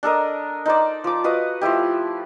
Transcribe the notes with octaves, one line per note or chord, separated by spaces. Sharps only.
D4 A4 A#4 D#5
D#4 C5 D5
F3 D6
F#4 B4 D#5 F5
F3 A3 E4 G4